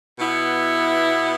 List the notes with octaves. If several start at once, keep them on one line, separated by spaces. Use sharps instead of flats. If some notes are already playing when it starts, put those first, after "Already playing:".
B2 B3 E4